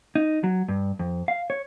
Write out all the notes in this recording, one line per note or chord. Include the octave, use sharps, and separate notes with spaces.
D#4
F#3
G2
F2
F5
C#5